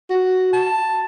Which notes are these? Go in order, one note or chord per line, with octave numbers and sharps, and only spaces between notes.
F#4
A5